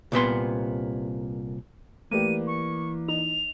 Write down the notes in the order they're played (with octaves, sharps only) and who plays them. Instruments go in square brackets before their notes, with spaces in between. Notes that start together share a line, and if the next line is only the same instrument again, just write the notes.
[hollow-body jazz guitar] C2 A#2 B3 C6
[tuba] E3 [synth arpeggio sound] A3 G4 [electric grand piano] A#3 B4 D5 [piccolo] D#7
[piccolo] C#6
[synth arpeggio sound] D#4 [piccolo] F7